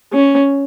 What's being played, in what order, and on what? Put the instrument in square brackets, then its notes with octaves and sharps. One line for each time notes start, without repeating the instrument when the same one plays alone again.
[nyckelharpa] C#4